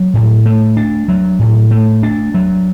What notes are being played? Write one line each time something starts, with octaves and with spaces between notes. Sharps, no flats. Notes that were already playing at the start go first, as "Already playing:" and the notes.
Already playing: F#3
A2
A3
D4
F#3
A2
A3
D4
F#3